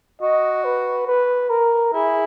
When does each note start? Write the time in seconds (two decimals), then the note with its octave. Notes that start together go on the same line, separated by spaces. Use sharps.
0.22 F#4 D#5
0.64 B4
1.07 B4
1.50 A#4
1.94 E4 G#4